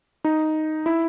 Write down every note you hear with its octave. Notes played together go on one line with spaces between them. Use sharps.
D#4
E4